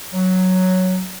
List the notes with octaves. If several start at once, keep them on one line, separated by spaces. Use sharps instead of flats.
F#3